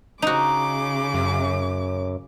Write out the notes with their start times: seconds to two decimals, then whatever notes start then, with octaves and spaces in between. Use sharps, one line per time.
0.22 C#3 D#4 F#4 D6
1.14 F#2